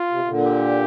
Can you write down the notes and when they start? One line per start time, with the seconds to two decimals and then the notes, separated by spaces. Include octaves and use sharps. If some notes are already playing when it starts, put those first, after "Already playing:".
Already playing: F4
0.10 C3
0.24 C3
0.28 A#2 D3
0.47 G4